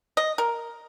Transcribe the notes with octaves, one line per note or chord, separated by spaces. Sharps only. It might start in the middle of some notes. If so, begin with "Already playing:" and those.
D#5
A#4